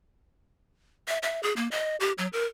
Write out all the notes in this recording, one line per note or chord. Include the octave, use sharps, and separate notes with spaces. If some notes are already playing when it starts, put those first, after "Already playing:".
E5
E5
G#4
A#3
D#5
G4
F#3
A#4